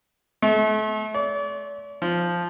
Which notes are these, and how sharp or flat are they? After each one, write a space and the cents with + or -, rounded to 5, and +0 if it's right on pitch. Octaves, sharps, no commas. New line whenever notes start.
A3 -35
D5 -40
F3 -5